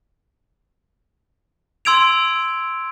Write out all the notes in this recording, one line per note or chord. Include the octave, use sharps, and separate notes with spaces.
C6 E6 G#6 D7 F7